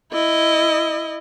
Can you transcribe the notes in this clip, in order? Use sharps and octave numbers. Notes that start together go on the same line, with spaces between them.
E4 D#5